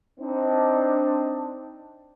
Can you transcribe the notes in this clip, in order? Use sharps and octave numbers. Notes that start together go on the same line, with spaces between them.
C4 D4 D#4